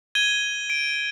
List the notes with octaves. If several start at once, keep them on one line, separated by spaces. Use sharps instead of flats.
G#6 D#7 G7
D7